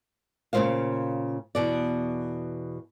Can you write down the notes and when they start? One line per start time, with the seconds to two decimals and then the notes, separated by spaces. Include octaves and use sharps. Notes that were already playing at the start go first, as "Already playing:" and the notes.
0.53 A#2 C#3 E3 F#3 C5 F5
1.55 E2 B2 D5